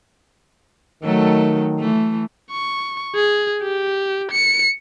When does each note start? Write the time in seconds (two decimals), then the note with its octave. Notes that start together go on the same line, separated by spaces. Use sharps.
1.03 D#3 F#3 A3 A4
1.79 E3 A3
2.51 C#6
3.15 G#4
3.63 G4
4.31 C#7